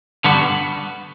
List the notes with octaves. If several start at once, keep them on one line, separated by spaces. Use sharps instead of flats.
G2 D3 G3 B3 F#4